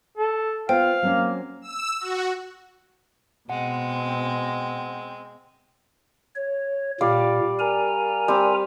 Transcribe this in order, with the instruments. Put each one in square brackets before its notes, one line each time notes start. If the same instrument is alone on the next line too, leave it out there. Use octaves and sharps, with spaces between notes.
[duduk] A4
[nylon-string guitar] B3 [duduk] F4 [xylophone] C5 G5 [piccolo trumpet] F5
[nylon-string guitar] F#3 C4 C#4 [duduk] A#3
[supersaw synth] E6
F#4
[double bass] B2 [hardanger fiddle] G#3 [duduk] C4 [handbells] F#5
[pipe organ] C#5
[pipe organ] A#2 [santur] G3 D5 F5
[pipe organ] A#4 G#5 A#5
[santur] G3 C4